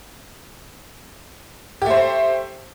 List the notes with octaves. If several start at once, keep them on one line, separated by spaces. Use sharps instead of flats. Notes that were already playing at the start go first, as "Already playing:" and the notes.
A3 G4 C5